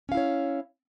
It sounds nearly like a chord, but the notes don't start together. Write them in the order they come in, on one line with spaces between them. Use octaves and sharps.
C#4 F5 E4 C#5